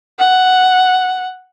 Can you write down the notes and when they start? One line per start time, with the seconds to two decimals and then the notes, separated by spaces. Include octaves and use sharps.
0.19 F#5